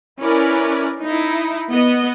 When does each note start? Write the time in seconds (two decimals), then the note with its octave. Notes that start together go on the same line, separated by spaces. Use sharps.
0.19 C#4 E4 A#4 B4 D5
1.03 D#4 E4
1.69 B3 D#5